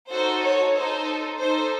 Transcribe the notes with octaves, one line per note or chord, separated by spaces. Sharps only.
D#4 F#4 A4 C5
C#5
D#4 A4 C5
D#4 A4 C5